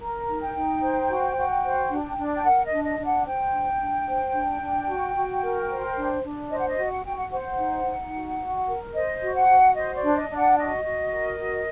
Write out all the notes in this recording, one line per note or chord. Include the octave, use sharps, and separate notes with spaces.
A#4 A#5
D#4
G5
D#4
C5
F#4
F#4
C5
D4
D4
G5
A#4 F#5
D#5
D4
D#5
D4
F#5
C5 G5
D4
D4
C5
D4
D4
F#4
F#4
A#4
C5
D4
D4
C5 D#5
F#5
D#5
F#4
F#5
F#4 G5
F#5
C5 F#5
D#4
D#4
F#4
F#4
A#4
C5 D#5
F#4
F#5
F#4
C5 D#5
D5
D4
D#5
D4
F#5
F#4 D#5
F#4
A#4
F#4